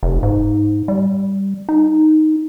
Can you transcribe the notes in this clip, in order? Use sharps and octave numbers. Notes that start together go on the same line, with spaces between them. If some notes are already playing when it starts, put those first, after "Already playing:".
F1
G#2
G3
D#4